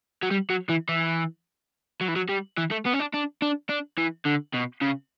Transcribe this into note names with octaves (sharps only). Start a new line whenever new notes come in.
F#3
G3
F#3
E3
E3
F#3
E3
F#3
G3
E3
A3
B3
C#4
D4
D4
D4
D4
E3
D3
B2
C#3